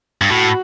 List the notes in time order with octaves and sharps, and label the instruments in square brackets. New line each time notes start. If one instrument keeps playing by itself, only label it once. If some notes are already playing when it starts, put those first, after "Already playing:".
[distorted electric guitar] G2
[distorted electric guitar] A2 [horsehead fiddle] F#4